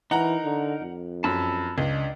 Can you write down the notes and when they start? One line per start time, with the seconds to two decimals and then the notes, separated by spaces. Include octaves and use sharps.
0.11 E3 D#4 A#4 F#5 A#5
0.44 D3
0.82 F2
1.24 F#2 A5 B5 E6
1.78 C#2 D4 D#5